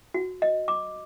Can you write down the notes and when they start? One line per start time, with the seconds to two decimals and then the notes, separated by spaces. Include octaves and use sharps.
0.14 F#4
0.42 D#5
0.68 D6